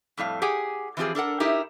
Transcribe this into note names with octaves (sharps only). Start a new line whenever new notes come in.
F2 A2 G3 F5
G4 G#4 F#5 G#5
E3 F3 C4 F4 G4 G#4
D4 A4 A#4 F#5
D#4 E4 G4 A#4